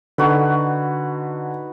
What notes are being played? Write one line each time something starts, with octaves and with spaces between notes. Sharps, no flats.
D3 D#4 F#4 B4